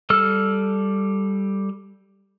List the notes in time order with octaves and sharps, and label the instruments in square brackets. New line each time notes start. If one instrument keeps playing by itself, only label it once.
[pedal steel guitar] G3 A4 E6 F6